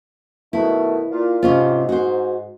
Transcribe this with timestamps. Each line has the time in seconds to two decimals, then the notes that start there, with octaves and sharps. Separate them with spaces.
0.53 B2 D#3 A3 E4
1.11 A#2 F4
1.43 G#2 C3 C#4 F4
1.89 F#4 C5